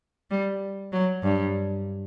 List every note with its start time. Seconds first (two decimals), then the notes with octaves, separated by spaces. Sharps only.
0.31 G3
0.93 F#3
1.23 G2